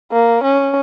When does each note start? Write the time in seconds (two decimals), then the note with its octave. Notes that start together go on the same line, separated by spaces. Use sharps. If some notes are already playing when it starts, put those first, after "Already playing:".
0.12 A#3
0.43 C#4